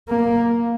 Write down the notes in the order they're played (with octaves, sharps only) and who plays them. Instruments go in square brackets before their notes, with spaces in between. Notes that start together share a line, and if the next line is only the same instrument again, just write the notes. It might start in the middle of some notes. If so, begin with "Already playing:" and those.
[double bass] A#3